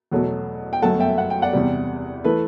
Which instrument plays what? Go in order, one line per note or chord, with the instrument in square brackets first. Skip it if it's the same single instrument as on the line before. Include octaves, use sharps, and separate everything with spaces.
[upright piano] E2 B2 F#3 A3
G5
G1 F#2 F#3 A3 F#5 A5
E5 G5
F#5
G5
D5 F#5
E2 C3 G3
E3 A3 B4